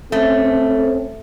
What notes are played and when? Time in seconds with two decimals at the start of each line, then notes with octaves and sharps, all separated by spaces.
0.12 A3 C4 C#4 A4